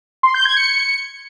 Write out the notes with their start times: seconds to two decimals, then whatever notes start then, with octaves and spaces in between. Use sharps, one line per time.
0.23 C6
0.34 G6
0.45 G#6
0.57 C#7